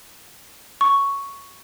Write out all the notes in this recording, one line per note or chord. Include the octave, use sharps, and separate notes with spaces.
C#6